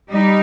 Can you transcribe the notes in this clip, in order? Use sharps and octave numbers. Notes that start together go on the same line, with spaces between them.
G3 D#4